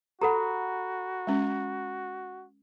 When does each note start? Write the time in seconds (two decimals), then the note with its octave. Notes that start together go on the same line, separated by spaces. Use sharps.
0.22 F#4 G4 A4 F#5 A#5 B5
1.27 G#3 C#4